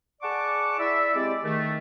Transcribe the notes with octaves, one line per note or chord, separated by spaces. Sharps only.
G#4 D5 F#5 A5 C#6 D6
E4 D5 E5
G#3 C4 G4 D5
D#3 A3